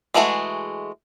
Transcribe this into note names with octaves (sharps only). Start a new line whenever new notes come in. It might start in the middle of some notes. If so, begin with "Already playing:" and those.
E3 G#3 A3 F#4 G#4